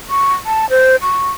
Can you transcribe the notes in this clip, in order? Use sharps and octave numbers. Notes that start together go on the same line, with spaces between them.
C#6
A5
C5
C#6